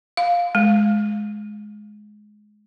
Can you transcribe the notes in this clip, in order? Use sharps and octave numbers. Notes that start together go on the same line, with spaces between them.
F5
G#3